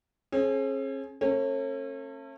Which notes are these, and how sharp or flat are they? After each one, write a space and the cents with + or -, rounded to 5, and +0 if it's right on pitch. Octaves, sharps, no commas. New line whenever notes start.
C#4 -45 G#4 +30
A3 +35 C#4 -40